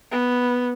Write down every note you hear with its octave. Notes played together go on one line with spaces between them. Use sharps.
B3